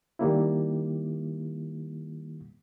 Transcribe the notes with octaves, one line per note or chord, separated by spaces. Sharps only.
D#3 G3 A#3 E4